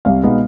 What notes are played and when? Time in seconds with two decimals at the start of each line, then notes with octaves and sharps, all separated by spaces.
0.05 C2 F5
0.23 B2 G#3 B3 D#4